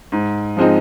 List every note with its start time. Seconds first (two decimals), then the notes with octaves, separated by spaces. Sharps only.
0.12 G#2
0.57 F3 G#3 C4 D#4